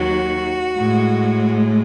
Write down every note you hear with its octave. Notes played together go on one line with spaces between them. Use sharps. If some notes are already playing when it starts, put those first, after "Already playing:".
Already playing: D#2 D#3 F#3 F#4
A2 G#3